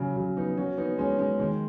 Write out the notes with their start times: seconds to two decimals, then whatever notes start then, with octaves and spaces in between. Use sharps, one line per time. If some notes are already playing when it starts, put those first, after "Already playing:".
Already playing: C#3 F#3
0.16 C#3 F#3
0.37 B3 D#4
0.57 C#4 F#4
0.77 B3 D#4
0.98 G#3 C#4
1.19 G#3 C#4
1.40 D#3 G#3